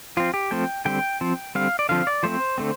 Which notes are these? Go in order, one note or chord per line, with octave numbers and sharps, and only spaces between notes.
F3 C4 F4
G4
F3 A3 C4 G5
D3 G3 C4 G5
F3 C4
D3 G3 C4 F5
D5
D3 F3 C4 F5
D5
F3 A3 C4 C5
D3 A3 C4